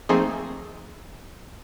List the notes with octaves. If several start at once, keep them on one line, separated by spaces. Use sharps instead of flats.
F3 A3 A#3 C4 D#4 G#4